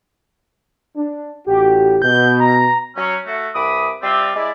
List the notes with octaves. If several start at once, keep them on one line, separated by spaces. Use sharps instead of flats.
D4
A1 A2 F#4 G4
B2 G6
A#5
F#3 C#4
A3 F#4
C2 B4 D6 D#6
G3 C4 F4 D5 E5
G#3 E4 D5